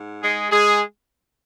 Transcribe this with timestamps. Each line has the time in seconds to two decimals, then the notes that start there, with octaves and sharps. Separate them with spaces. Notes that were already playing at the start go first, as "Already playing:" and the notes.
Already playing: G#2
0.23 G#3 G#4
0.50 G#3 G#4